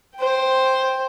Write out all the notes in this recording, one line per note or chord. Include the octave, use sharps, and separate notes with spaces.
C5 G5